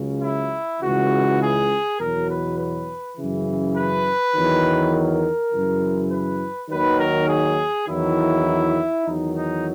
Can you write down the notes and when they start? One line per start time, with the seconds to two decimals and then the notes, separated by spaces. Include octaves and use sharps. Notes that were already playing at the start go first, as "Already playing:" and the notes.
Already playing: C#2 C#3 F#3
0.21 E4
0.81 C#2 C#3 E3 F#4
1.39 G#4
1.98 E2 B2 F#3 A#4
2.28 B4
2.57 B4
3.15 F#2 C#3 E3
3.75 B4
4.34 E2 D#3 F#3
4.93 A#4
5.52 F#2 C#3 E3
6.10 B4
6.69 D#2 D#3 F#3 B4
6.99 A#4
7.29 G#4
7.87 E2 D#3 F#3 E4
9.05 E2 D#3 F#3 D#4
9.35 D#4